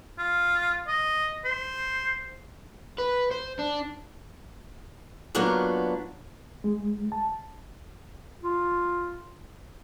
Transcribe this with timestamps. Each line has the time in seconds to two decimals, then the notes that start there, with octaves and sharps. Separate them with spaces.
0.18 F4
0.88 D#5
1.45 C5
2.98 B4
3.31 C5
3.59 D4
5.35 F#3 A#3 B3 D4 F4 F#4
6.64 G#3
7.12 A5
8.43 F4